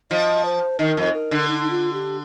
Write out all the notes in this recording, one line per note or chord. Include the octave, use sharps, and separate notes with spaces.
F3 D#5
C5
D#3 A#4
F2
A#4
D3
D#4
D#4
F4
G4